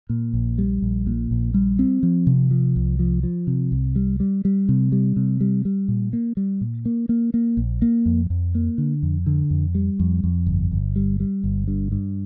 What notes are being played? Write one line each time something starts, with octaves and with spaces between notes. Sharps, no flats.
A#2
A#1
G3
A#1
A#2
A#1
G3
C4
F3
C3
F3
C2
F3
F3
C3
C2
G3
G3
G3
C3
G3
C3
G3
G3
A#2
A#3
G3
A#2
A#3
A#3
A#3
A#1
A#3
F2
F2
A#3
D3
F2
D3
F2
G3
F2
F2
G1
G1
G3
G3
G1
G2
G2